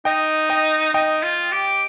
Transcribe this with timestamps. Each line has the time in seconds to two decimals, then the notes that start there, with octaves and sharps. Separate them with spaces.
0.05 D#4 D#5 G5
0.50 D#5 G5
0.94 D#4 D#5 G5
1.23 F4
1.52 G4